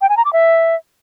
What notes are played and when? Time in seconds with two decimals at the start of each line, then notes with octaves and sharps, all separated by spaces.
0.01 G5
0.09 G#5
0.17 A#5
0.25 D6
0.33 E5